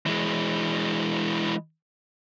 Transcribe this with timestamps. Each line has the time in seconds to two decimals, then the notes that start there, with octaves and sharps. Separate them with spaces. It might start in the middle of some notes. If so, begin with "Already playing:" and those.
0.06 E3 G#3